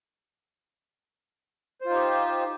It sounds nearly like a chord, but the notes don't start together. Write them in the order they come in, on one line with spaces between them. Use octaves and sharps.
C5 F4 D#4 G4